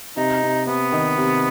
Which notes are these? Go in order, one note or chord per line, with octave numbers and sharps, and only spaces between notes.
C3 D#4
C3
C3 B3
D#3
C3